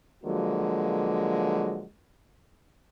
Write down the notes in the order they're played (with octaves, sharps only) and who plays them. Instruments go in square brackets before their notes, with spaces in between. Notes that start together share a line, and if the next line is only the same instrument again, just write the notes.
[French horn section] D3 F3 F#3 G#3 A#3 F#4